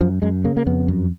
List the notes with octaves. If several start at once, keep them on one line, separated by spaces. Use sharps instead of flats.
F#2 F3
F#2 G#3
C#3 A#3
A#3
F2 B3
F#2